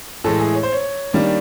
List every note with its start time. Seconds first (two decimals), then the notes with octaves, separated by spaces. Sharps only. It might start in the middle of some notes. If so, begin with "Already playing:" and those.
0.24 A2 E3 G#3 A4
0.39 G#4
0.54 C#5
0.63 C5
0.73 C#5
1.13 D#3 G3 A#3 D4